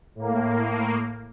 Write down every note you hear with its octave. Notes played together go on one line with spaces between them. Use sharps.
A2 A#3